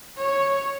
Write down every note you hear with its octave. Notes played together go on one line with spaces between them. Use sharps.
C#5